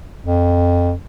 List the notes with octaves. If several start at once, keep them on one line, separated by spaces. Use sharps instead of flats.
F2